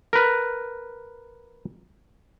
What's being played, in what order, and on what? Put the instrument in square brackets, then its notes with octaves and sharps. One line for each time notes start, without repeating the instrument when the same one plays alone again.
[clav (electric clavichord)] A#4 B4